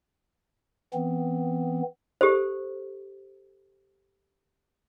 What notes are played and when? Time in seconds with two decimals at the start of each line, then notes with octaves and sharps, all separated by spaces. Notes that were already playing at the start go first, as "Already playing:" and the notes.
0.94 E3 B3 C4
2.21 G4 A4 C5